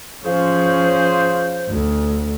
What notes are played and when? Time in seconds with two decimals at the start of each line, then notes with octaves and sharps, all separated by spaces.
0.25 F3 C#4 F4 G#4 C5
1.69 D2